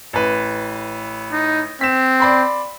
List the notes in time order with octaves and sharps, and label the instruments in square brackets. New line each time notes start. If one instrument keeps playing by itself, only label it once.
[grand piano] A1 B4
[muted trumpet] D#4
[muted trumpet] C4 [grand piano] B6 E7
[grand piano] D5 B5 C6